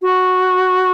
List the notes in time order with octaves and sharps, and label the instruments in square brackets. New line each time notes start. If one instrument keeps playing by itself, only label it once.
[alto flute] F#4